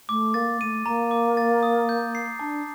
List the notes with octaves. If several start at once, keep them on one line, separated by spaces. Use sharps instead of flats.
A3 D6
A#3 A6
A3 D#7
A#3 A#5
D6
A6
D#6
G6
C7
D4 A5